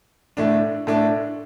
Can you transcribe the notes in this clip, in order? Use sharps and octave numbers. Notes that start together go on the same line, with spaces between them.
A2 A3 D4
A2 A3 D4